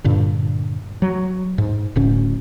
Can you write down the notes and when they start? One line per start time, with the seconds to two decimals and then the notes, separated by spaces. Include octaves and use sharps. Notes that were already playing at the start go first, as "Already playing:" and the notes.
0.04 G2 A#2 D3
1.02 F#3
1.58 G#2
1.96 D1 D2 A2 C#4